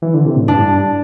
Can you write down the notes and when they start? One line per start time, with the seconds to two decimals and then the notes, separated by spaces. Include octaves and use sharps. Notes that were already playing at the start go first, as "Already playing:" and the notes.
0.02 E3
0.14 D3
0.26 C3
0.36 A2
0.48 G2 D4